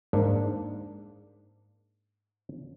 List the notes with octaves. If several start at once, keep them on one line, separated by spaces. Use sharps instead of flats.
G#2 A#3 D4